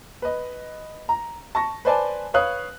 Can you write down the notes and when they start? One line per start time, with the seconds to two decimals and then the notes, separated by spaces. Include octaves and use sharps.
0.22 B4 D#5
1.09 A#5
1.55 A5 C#6 A#6
1.85 B4 C5 D5 G#5 A5
2.34 B4 C#5 F5 D#6 F#6